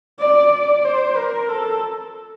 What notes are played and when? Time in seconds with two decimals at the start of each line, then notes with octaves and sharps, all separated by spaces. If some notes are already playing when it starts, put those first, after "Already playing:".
0.20 D5
0.53 D5
0.85 C5
1.17 A#4
1.49 A4